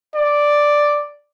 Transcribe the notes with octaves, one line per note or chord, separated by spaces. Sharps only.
D5